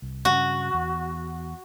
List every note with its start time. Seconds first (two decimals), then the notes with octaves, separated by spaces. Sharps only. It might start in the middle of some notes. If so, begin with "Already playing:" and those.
0.02 C2
0.25 G2 C#3 F#4
0.74 E2